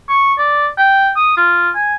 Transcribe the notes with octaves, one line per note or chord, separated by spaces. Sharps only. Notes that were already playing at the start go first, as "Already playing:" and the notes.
C#6
D5
G5
D#6
F4
G#5